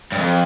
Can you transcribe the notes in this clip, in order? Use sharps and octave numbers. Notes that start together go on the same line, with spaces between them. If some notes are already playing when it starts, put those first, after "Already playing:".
G2
F2